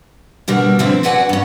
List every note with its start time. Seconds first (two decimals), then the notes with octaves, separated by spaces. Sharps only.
0.48 B2 D3 G3 A#3
0.79 B2 D3 F3 A3 C4 E4
1.03 F#4 B4 D5 F#5 G#5
1.29 G2 C#4